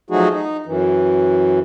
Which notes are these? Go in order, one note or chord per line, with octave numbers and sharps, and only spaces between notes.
F3 F#3 A3 D#4 F#4 G#4
D#4
F#2 E3